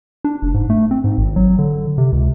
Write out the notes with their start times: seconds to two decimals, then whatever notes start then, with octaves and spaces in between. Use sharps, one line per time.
0.24 D4
0.42 F1
0.54 G#2
0.70 A3
0.91 C4
1.04 G#2
1.18 G#1
1.36 F#3
1.58 D3
1.98 C3
2.12 C#2